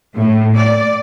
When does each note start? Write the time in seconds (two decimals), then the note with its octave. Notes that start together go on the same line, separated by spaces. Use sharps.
0.15 A2
0.55 D5